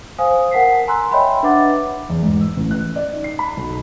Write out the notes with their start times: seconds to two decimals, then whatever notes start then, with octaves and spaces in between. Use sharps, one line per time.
0.18 C5 F5 G#5 D#6
0.51 A#4 F#5 A5 B6 C7
0.87 F#5 G#5 A#5 C6 E6 F#6
1.11 C#5 D#5 E5 G5 B5 C6
1.43 D4 B4 E5 F#5 D6 A6
2.09 E2
2.23 G#2
2.41 E6
2.56 A1
2.71 F#6
2.96 D5
3.13 D#4
3.24 C7
3.39 B5
3.57 B1